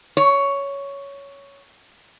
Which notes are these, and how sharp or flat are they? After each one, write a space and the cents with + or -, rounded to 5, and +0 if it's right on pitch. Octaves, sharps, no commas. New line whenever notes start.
C#5 +10